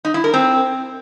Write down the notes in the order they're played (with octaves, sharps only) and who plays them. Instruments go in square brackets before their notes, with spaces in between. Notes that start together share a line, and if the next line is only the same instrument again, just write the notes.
[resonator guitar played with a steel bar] D#4
E4
A#4
C4